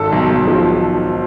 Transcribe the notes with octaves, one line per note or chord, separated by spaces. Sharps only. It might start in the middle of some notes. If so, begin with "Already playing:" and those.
Already playing: G#1 A4
B1
B1
F3